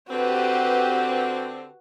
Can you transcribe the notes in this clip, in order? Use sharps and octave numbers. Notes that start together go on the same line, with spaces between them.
D3 C4 F#4 G4 B4